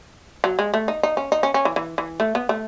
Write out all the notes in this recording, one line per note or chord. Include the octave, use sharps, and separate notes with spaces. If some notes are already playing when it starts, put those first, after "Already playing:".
F#3
G#3
A3
D#4
D#4
C#4
D#4
C#4
C#4
E3
E3
E3
A3
B3
A3